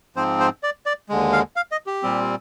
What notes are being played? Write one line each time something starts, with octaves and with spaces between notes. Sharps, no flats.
G#2 F3 C4 C5
C5
D5
D5
D#2 D3 G#3
F5
F5
D#5
G4
A#2 G3 C4